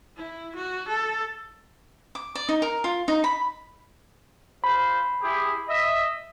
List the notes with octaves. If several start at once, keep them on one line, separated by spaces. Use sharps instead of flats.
E4
F#4
A4
D6
D5
D#4
A#4
F4
D#4
B5
D4 F4 C5 B5
E4 G4 G#4
D#5 E5